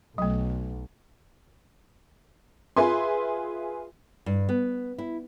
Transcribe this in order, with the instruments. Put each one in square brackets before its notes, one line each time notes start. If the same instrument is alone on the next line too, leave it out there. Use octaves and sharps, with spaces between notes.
[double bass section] B1 [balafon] F#3 A3
[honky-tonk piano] F4 G#4 B4 E5 G#5 C6
[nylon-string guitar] G2
B3
E4